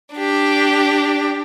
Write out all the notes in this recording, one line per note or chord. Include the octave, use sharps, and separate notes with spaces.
D4 G4